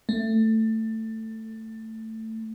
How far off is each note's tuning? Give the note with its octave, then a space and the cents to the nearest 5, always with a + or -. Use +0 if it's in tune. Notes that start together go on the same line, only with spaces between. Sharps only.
A3 +15